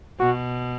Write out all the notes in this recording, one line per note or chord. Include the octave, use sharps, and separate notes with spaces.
B2 F#4